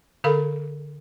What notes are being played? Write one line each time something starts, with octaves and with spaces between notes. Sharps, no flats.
D3 A4 A#4 F5 B5